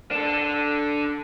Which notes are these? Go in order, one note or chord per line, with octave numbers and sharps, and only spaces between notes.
D4 A4